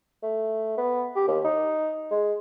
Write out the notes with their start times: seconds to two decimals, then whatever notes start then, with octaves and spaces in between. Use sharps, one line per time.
0.23 A3
0.78 B3
1.16 G4
1.28 D#2
1.45 D#4
2.11 G#3